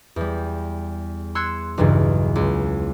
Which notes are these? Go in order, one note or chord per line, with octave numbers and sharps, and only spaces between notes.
E2 G3
C6 E6 F#6 G#6 C#7
B1 E2 G2 C#3 E3
C#2